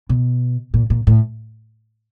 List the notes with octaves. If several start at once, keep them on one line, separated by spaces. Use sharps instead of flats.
B2
A#2
A#2
A2